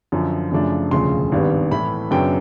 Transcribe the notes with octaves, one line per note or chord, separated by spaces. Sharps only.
F#2 D3 F3
F#2 C#3 F3 A3 D4
E1 D2 C#3 F3 C6
G#1 G2 D#3 G3 B3
A2 E3 A3 B5
F#2 C#3 F#3 B3 D4 G5